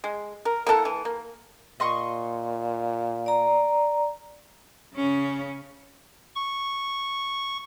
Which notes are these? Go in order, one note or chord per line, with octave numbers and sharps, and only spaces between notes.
G#3
A#4
A#3 E4 A4 F#5
E3
A#3
A#2 D#5 C6 C#6
D5 A#5
C#3 C#4
C#6